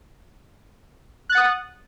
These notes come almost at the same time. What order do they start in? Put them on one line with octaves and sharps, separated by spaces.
F#6 A6 F#5 D#6